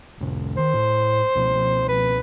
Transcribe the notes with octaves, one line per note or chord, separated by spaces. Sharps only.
C2 F2 C3
D#3 C5
A2
C#2 B2 F3
B4